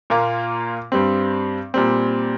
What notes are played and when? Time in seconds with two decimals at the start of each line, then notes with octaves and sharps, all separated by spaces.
0.10 A#2 A#3 F4
0.92 G2 G3 C4
1.74 A#2 G3 C4